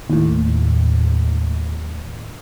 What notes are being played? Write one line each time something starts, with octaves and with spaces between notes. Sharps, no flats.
D#2 A2